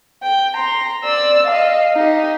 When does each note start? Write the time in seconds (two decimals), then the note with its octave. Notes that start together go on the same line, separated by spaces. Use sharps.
0.23 G5
0.56 A#5 C6
1.04 D5 E6
1.47 D#5 F5
1.96 D#4 G4